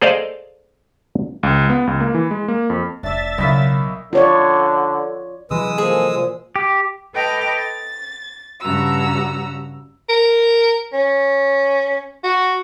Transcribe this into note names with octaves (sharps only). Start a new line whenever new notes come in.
G#4 A4 C5 D5 D#5 F5
C#2
B3
C#2
A#3
E3
G#3
A#3
F2
F1 D4 D5 E5 A6
B1 C#3 A#3 E4 D#5 B6
D3 F4 C#5 D5
C3 E3 F#3 G#3 B4 D#6 E6
F3 A#3 G#4 A4
A#2 F3
G4
A4 B4 D#5 G5 D6 F6
A6
G2 C#3 F#4 A#5 E6
A#4
C#4
F#4